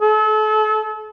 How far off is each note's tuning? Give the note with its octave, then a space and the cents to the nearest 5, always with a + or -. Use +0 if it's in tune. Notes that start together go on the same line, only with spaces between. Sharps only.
A4 -35